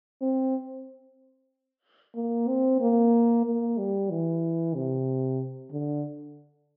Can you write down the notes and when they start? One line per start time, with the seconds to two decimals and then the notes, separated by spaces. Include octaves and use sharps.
0.22 C4
2.16 A#3
2.48 C4
2.81 A#3
3.46 A#3
3.78 G3
4.11 E3
4.75 C3
5.72 D3